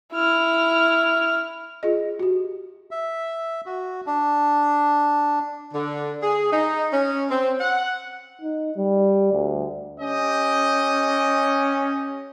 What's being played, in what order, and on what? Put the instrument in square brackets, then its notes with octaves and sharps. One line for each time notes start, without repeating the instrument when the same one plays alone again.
[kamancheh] E4 F6
[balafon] F4 G#4 D#5
F#4 G4
[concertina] E5
F#4
D4
[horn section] D3
G#4
D#4
C#4
C4
F#5
[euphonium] D#4
G3
D2
[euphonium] C#4 [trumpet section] G4 D#5